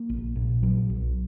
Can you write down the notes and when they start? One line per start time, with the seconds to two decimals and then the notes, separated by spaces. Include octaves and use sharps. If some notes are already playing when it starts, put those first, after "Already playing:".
Already playing: A#3
0.09 A#1
0.36 A#2
0.63 F#3
0.90 B1